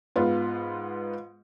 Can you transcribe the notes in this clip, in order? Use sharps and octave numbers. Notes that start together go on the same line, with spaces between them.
G#2 B3 F4